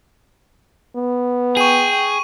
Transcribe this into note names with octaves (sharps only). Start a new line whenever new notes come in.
B3
G#4 G5 C#6 D#7